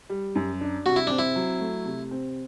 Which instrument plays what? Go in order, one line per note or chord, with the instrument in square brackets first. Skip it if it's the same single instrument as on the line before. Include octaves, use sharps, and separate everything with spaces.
[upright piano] G3
F#2
D4
[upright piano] C3 [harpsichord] F#4
[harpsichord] E4
[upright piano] C4 [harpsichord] D4
[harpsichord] E4
[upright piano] F#3
A3
C3
C4